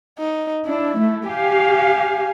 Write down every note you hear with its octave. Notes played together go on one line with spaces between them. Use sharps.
D#4
D4 E4
A3
G4 F5 G#5